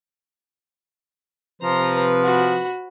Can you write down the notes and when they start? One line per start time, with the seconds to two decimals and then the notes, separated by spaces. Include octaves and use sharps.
1.62 C3 F3 B4 C5 A#5
2.23 F#4 B5